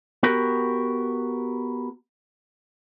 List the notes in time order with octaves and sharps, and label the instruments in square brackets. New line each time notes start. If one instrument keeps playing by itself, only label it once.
[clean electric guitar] B3 F#4 G4 A#4